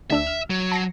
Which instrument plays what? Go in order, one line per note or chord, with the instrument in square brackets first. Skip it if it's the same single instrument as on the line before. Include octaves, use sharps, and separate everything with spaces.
[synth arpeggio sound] D2 D4 E6 [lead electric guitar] E5
[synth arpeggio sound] F6
[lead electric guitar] F#3
[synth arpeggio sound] A5 A#6 C7